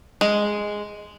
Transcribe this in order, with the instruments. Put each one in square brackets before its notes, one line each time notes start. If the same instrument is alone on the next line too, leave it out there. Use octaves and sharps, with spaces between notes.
[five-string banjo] G#3